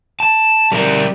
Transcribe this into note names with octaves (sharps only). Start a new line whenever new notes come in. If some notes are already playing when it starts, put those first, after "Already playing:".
A5
G3 A#4